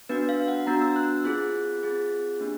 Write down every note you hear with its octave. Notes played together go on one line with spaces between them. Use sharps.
B3 D4 F#4 B4
F5
F#5
B3 D4 F#4 A#5
E6
F#6
C4 F4 G#4 F#6
C4 F4 G#4
A#3 D4 G4